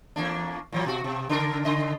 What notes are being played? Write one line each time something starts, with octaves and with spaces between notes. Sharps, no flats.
E2 A#3 D4
A#2 E3 F#3
B2 F#4
B2
C#3 D4 A#4
C#3 D#5